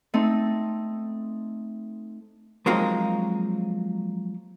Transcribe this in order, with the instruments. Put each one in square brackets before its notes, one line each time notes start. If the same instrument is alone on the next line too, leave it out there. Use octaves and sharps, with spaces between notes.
[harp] A3 C4 D#4
[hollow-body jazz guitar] F3 F#3 G#3 A#3 C4 D#4